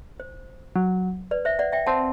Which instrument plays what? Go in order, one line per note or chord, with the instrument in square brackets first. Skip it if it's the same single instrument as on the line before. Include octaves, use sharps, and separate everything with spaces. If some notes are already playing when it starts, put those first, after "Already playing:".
[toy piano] C5
[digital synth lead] F#3
[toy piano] B4 D5
C5 E5
D5 F#5
E5 G5
[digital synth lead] C4 [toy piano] F#5 A5